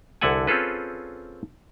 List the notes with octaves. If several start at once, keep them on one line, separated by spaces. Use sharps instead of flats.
C2 D3 E4 A4 F#5 G#5
C4 C#4 F4 G#4 A4 B4